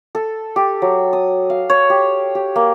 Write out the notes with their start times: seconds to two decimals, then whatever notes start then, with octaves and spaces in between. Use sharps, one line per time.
0.15 A4
0.56 G4
0.82 F#3
1.13 D#6
1.50 F5
1.70 C#5
1.90 G4
2.35 G4
2.56 A#3